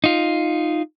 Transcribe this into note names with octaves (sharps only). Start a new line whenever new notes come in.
D#4 F4